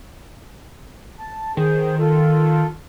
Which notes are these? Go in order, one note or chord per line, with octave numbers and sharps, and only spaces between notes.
A5
D#3 G#4 C5
F4 A4